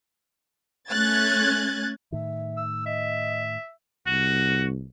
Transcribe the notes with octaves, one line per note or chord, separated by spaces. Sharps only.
A3 C#4 F#6 G#6 A6
A2 D#3 E5
E6
D#5 E5
C2 F#4